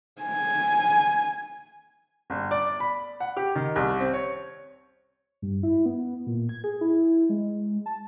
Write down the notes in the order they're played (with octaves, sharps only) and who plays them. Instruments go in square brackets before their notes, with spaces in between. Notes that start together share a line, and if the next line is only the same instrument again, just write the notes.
[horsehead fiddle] G#5
[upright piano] G1
D5
B5
F#5
G4
D#3
C2
C4
C#5
[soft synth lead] G2
E4
B3
A#2
G#6
G#4
E4
G#3
A5